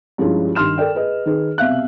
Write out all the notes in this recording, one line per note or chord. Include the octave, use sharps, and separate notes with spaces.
G2 F3 G#3 C#4 E4 F4
G2 D#3 C6 F6 E7
A4 A#4 D5 G5
G#4 B4 D#5
D#3 D#4 G#4 B4
C2 B2 E5 F5 F#6